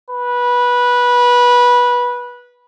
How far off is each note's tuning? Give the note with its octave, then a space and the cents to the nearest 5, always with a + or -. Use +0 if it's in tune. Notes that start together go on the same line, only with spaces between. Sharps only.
B4 -15